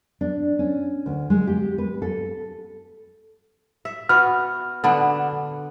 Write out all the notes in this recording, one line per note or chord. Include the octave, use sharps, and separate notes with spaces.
D4
C#4
D2
G#3
G4
B4
A4
E5
B3 F#4 F6
D3 B3 D4